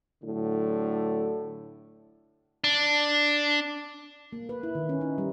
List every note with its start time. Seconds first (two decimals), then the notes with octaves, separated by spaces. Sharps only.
0.23 A2 D3 F#3
2.64 D4
4.33 A#3
4.49 B4
4.63 E4
4.75 D#3
4.89 C#4
5.01 D#4
5.18 G3